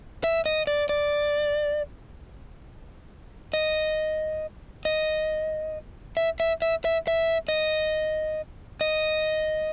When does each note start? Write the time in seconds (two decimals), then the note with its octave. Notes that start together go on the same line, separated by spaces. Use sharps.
0.24 E5
0.46 D#5
0.67 D5
0.89 D5
3.53 D#5
4.85 D#5
6.17 E5
6.40 E5
6.62 E5
6.85 E5
7.08 E5
7.48 D#5
8.81 D#5